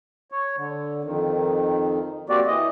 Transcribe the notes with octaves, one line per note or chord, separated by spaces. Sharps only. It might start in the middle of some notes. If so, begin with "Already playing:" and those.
C#5
D3
F2 D#3
A#3 C4 F#4 G4 D5
E3 D#5